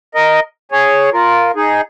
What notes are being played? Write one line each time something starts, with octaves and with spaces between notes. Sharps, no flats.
A#4 D#5
G#4 C#5
F4 A#4
D#4 G#4